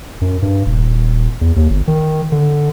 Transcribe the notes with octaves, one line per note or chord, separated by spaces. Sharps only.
F#2
G2
D#1
E2
D#2
G1
D#3
D3